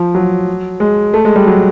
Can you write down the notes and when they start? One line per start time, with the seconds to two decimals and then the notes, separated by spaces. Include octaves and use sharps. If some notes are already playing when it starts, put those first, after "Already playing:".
Already playing: F3
0.15 F#3
0.80 G#3
1.14 A3
1.25 G#3
1.36 G3
1.47 F#3